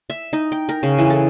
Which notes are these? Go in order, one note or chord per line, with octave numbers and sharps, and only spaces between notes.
E5
D#4
G5
A#4
C#3
E3
A4